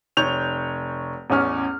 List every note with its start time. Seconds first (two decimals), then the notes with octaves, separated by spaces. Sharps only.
0.17 F1 C#5 G6 F7
1.30 A1 E2 C#4 F6